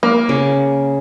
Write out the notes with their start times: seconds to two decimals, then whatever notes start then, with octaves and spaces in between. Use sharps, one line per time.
0.03 A#3
0.29 C#3